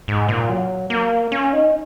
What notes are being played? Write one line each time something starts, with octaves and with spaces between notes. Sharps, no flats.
G#2
A#2
F#3
A#3
C#4
D#4